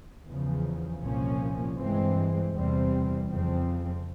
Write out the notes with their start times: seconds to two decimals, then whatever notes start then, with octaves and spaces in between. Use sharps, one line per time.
0.27 E2 C#3 F3
1.02 C2 A#2 F3 A#3 C#4
1.77 G2 E3 G#3 C4
2.53 E2 C3 G3 C4
3.28 F2 C#3 F3 C4